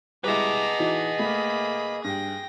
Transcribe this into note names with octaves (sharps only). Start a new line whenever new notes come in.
G3 G#3 E4 G#4 B4 D#5 A#5 D6
E3 D#4 F#4
A3 A#3 B5
G2 G5 A#6